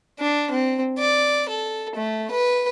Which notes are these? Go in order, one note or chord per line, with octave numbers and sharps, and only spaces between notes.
D4
C4
D5
A4
A3
B4